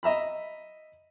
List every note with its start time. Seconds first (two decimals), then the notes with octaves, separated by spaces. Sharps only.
0.03 D#5 E5 A#5 B5